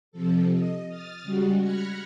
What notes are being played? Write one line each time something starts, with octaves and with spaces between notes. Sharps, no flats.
C3 F3 A4
D#5
D#6 F6 A6
C#3 G3 G#3 F#4
B5 F6 F#6 G#6 A#6 C#7